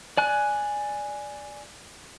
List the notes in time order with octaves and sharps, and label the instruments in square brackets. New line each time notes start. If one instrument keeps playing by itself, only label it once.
[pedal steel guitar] D5 G#5 F#6